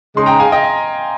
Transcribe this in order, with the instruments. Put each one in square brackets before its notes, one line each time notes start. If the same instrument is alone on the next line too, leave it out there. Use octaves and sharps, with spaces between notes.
[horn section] C#3 G#3 D#4 G#4 [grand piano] C6
[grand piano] G5 A#5
F5 G#5
D#5 G5